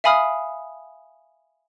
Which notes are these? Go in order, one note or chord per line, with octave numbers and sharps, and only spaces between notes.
E5 F5 G#5 B5 D#6 F6